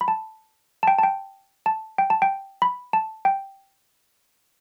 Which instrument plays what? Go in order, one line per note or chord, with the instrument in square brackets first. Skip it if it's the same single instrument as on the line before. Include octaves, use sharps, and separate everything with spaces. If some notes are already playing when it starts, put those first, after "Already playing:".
[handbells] B5
A5
A5
G5
A5
G5
A5
G5
A5
G5
B5
A5
G5